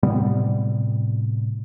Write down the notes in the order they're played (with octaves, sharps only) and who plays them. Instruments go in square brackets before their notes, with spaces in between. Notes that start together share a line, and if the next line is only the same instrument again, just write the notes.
[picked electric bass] A2 C3 G3 B3